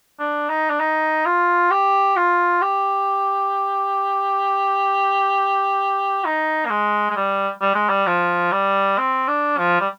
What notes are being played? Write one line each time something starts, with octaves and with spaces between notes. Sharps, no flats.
D4
D#4
D4
D#4
F4
G4
F4
G4
D#4
A#3
G#3
G#3
G3
G3
G#3
G3
F3
G3
C4
D4
F3
G3